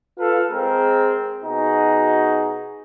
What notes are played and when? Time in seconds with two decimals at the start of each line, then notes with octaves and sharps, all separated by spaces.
0.18 F4 A4 B4 F5
0.51 G#3 C4 G#4 A#4
1.43 B2 D#4 F#4 G#4